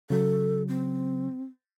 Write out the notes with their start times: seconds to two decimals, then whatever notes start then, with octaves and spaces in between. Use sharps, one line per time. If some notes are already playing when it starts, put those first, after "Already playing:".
0.10 C#3 F#3 A4
0.68 C4